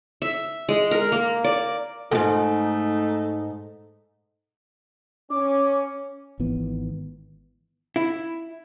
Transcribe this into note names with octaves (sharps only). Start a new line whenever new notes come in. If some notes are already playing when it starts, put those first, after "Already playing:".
E5
G#3
A#4
A#3
D5
D2 G#2 A3 D#4 A4
C#4 D6
G#1 D#3 E3 B3
E4